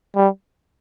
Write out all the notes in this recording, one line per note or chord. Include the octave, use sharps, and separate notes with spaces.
G3